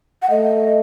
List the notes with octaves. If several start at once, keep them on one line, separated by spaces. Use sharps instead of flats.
F#5
A3 D#5